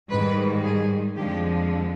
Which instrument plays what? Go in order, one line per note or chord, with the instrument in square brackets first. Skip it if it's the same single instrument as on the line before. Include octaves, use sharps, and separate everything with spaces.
[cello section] G#2 D#3 G3 B4
G#4
F2 D3 F3 G#3 G4